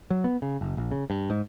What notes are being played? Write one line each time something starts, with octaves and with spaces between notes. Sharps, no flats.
F#3
B3
C#3
F#1
A#1
C#3
G2
G#2